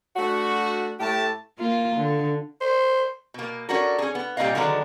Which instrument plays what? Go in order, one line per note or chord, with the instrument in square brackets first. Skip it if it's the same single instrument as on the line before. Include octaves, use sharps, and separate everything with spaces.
[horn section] A3 D4 F#4
A2 A3 G4 A5
[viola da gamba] A#3 F4
D3
[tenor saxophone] C5
[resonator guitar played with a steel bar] B2 A#3
C#4 D4 F#4 A4 A#4
C#4 G#4
B3
A#2 G3 A#3 C4 D#5 F5
D3 D#3 F#3 G#3 B3 D4